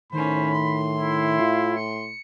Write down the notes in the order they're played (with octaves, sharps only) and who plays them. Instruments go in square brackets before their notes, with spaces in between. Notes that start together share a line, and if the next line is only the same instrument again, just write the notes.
[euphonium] A2 [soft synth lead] D#3 [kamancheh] C#4 C5 [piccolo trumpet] B5
[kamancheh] C6
[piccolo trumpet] E4
[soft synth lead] F4
C#7